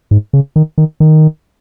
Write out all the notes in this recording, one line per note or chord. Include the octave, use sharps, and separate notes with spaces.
G#2
C#3
D#3
D#3
D#3